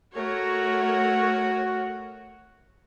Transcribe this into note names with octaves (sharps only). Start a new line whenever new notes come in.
A3 F#4 A#4 C#5